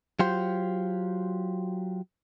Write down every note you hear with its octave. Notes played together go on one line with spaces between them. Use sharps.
F#3 F4 G4 C5